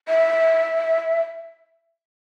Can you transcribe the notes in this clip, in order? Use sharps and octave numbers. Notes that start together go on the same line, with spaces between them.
E5